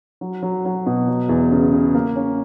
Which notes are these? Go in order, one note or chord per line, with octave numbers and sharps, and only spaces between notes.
F#3
F#3
F#3
B2
F#3
E2
C#3
C#3
A#3
C#4